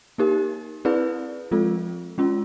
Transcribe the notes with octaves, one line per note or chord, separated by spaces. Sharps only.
A#3 D#4 G4 A#4
C4 E4 G#4 B4 D5
F3 G#3 C4 F4 A4
G#3 C#4 F4